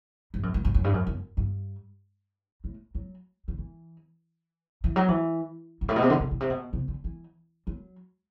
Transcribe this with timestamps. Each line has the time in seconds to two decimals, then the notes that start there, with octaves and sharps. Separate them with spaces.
0.34 G2
0.43 F#2
0.54 G2
0.65 G2
0.74 F#2
0.84 G2
0.94 F#2
1.07 F#2
1.37 G2
2.64 A2
2.95 F#3
3.48 D3
3.58 E3
4.84 E3
4.96 F#3
5.09 E3
5.81 G2
5.89 A2
5.96 B2
6.02 C3
6.10 D3
6.20 C3
6.31 B2
6.40 C3
6.50 B2
6.73 C3
6.88 D3
7.04 E3
7.67 F#3